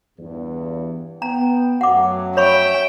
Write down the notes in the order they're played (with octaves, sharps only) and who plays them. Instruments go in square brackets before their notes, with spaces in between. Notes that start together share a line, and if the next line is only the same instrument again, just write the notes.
[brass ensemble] E2 G2
[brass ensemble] B3 G5 [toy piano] A#5
[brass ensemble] F#2 F#3 A3 [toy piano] F#5 D6
[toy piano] C#5 B5 C#6 [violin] E5 G5